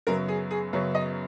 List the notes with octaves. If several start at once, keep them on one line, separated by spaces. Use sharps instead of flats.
F#2 C#3 F#3 B3 A#4
G#4
G#4
F#2 C#3 F#3 B3
D#5